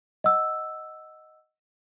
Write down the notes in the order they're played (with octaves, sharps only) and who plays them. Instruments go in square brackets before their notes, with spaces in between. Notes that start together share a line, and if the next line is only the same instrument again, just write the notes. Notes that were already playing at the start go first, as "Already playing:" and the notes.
[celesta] D#5 F#5 E6